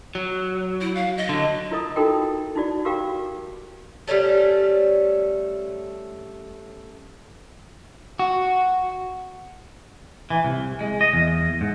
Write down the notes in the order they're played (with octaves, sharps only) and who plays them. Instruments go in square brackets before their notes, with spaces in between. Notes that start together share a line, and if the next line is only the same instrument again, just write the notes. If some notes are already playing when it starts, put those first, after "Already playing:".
[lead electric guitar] F#3
[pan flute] E4
F5
D#5
[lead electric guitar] D3 F#3
[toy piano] E4 F4 A#4 D#5 A#5 D#6
D#4 E4 F#4 A4 A#4 G5
D#4 E4 F#4 D5
F#4 G4 A#4 F5 G5 D6
[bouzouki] G3 A3 C#4 A4
[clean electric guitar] F#4
E3
C2
G#3
D#5
E2
G#2